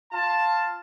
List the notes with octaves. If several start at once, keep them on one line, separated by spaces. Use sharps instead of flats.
F4 A5